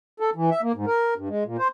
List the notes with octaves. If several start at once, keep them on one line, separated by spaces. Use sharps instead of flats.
A4
E3
E5
A#3
G#2
A#4
G2
G#3
A#2
C5